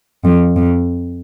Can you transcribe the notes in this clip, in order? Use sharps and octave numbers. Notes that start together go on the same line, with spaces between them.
F2
F2